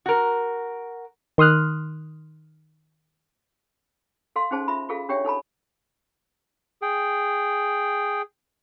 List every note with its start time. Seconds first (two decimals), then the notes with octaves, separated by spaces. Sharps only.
0.06 F#4 A#4
1.38 D#3 C6 D#6 F6 F#6
4.36 A4 F5 C6
4.51 C#4 D#4 G#4 C5 A5
4.68 F4 E5 B5
4.89 F4 G#4 A4 F5
5.09 D4 G4 C#5 E5 G5
5.25 D#4 A4 A5 B5
6.82 G#4 G5